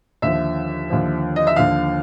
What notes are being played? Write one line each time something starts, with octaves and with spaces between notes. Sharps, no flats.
D#2 D3 F3 E5
D#2 D3 F3
D#5
E5
D#2 D3 F3 F5